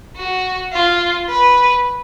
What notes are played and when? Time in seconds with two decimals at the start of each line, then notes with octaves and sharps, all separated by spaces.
0.17 F#4
0.73 F4
1.29 B4